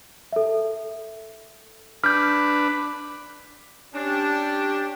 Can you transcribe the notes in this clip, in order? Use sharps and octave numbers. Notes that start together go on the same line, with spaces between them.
A4 E5
D4 B4 F6 G6
C#4 D4 G4